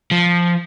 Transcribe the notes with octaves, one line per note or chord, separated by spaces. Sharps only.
F3